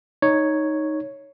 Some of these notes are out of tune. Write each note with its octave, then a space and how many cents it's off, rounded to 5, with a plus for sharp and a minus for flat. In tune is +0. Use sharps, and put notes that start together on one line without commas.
D#4 +0 C#5 +0